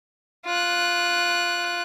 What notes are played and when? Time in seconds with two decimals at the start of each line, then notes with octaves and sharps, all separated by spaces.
0.46 F4 F#6